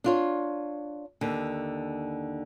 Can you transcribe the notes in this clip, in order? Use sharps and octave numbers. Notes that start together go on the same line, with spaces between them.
D4 F4 C#5
D#2 D3